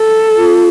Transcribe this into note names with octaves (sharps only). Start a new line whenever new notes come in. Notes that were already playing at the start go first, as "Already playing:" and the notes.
Already playing: A4
F4